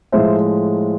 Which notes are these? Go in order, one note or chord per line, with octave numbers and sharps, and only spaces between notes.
A2 F3 G#3 C5 E5